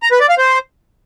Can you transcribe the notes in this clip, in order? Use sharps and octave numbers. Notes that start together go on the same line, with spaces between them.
A#5
B4
D5
F5
C5